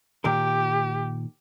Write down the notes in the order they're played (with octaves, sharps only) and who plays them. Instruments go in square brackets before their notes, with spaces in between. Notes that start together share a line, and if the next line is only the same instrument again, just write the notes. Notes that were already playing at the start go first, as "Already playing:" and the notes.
[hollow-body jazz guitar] A#2 D#3 A#4 [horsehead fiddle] G4